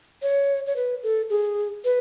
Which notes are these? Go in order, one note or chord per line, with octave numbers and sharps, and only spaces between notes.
C#5
C#5
B4
A4
G#4
B4